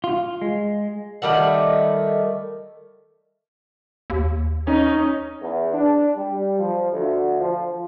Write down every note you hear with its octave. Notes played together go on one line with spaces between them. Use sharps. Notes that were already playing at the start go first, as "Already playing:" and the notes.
F4
G#3
D#3 G3 A3 F#5
D#2
C#4 D#4
E2
D4
G3
F3
D2
F3